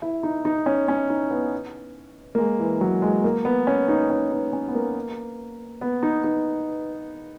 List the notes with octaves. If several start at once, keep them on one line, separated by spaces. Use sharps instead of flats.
E4
D#4
D#4
C#4
C#4
D#4
B3
A#3
G#3
E3
F#3
G#3
A#3
B3
C#4
D#4
C#4
D#4
C#4
B3
A#3
B3
D#4
D#4